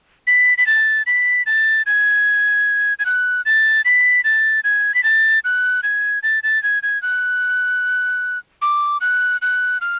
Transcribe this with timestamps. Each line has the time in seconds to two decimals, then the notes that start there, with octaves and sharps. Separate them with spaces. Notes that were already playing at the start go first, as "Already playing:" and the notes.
0.27 B6
0.58 B6
0.67 A6
1.07 B6
1.46 A6
1.86 G#6
2.99 G#6
3.06 F#6
3.46 A6
3.85 B6
4.24 A6
4.64 G#6
4.95 B6
5.04 A6
5.44 F#6
5.83 G#6
6.23 A6
6.43 A6
6.63 G#6
6.83 G#6
7.02 F#6
8.62 D6
9.01 F#6
9.42 F#6
9.81 F6